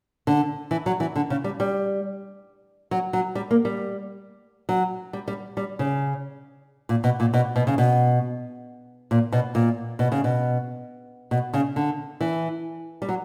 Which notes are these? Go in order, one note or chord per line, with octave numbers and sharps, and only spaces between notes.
D3
E3
F#3
E3
D3
C#3
G3
G3
F#3
F#3
G3
A#3
G3
F#3
G3
G3
G3
C#3
A#2
B2
A#2
B2
B2
C#3
B2
A#2
B2
A#2
B2
C#3
B2
B2
C#3
D3
E3
G3
F#3